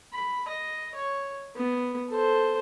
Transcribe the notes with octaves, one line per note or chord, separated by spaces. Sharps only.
B5
D#5
C#5
B3
A4 C5